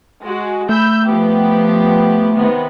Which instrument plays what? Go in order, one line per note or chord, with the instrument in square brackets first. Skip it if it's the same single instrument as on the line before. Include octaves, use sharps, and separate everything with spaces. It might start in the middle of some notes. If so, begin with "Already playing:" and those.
[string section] G#3 F#4
[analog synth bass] A3 [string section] B5 E6 G6
[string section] F3 B3 G4
C3 D#3 B3